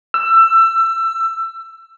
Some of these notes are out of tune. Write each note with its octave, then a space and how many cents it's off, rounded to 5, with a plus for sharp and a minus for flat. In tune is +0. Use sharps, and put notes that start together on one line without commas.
E6 +20